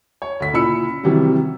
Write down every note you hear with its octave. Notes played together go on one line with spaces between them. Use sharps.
C#5
D2 B6
A#2 C#3 E4 B5 E6 C#7
C3 D#3 E3 F#3 G3